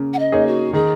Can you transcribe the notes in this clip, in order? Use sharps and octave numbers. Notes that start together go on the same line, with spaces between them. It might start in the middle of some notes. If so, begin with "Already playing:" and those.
Already playing: C#3 A#3
F#5
D#5
A#3 D#4 G#4 C#5
F#4
D#3 G#4